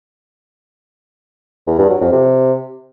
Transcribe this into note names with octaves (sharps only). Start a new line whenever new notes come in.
E2
G2
F#3
F2
C3